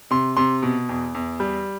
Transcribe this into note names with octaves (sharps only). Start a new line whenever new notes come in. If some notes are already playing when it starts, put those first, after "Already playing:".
C3 C6
C3 C6
B2
E2
E2
G3